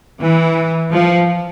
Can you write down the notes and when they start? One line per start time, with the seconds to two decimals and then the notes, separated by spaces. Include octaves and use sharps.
0.19 E3
0.91 F3